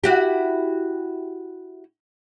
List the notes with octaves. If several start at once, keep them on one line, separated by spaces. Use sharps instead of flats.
E4 F#4 G4